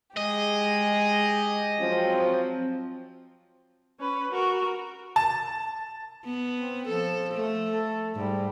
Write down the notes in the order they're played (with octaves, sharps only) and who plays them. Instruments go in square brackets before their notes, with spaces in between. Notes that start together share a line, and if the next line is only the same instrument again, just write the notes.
[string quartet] G#3 G4 G#4 [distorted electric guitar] D#5
[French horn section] F3 F#3 C4
[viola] C#4 B4
F#4 A#4
[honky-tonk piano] A5
[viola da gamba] B3
[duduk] C4
[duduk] F3 [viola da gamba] A4
[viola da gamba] A3
[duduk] A4
[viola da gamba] G#2 [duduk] G3